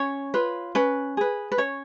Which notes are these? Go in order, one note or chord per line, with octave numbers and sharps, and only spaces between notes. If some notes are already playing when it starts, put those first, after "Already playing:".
Already playing: C#4 C#5
F4 B4
C#4 B4
G#4 B4
B4
C#4 C#5